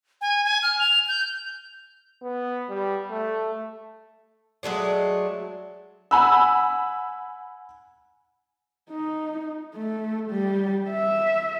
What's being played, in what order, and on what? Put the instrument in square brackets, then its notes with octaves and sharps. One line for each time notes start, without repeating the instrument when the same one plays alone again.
[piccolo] G#5
G#5
F6
F7
G6
[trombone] B3
G3
A3
[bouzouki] F#3 G#3 A3 D4
[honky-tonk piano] F#5 G#5 B5 E6
[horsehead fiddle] D#4
A3
G3
E5